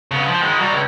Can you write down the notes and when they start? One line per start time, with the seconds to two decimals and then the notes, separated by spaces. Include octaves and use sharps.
0.11 C#3 B3
0.28 F3
0.42 D#3 G#3
0.59 F#3 G3
0.72 C#2